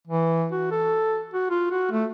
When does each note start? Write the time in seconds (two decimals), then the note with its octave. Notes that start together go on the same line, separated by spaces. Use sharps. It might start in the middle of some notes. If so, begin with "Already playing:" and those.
0.07 E3
0.52 F#4
0.71 A4
1.34 F#4
1.50 F4
1.71 F#4
1.91 A3